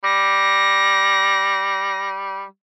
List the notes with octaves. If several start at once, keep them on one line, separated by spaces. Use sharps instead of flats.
G3 A#6